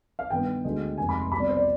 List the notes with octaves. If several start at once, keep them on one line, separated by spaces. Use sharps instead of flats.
F5
G2 D#3 B3 G5
D2 D3 G#3
F1 D#2 D#3 G#3 G#5
B5
C6
C2 B2 B3 B5
D5
C5
D5